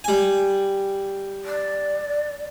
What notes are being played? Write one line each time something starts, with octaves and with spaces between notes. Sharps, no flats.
G3 G#5
D5